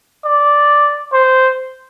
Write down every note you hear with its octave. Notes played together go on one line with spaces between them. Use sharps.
D5
C5